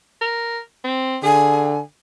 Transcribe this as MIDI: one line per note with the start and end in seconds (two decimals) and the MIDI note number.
0.21 0.60 70
0.84 1.18 60
1.23 1.80 50
1.23 1.74 68
1.23 1.78 80